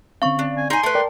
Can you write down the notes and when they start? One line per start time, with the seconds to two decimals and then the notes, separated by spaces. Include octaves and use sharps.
0.22 D3 C4 C#4 F5 C#6
0.39 D4
0.57 G#5
0.70 D#4 G#5 C6
0.83 A3 B4 A5
0.95 A#4 D5 G5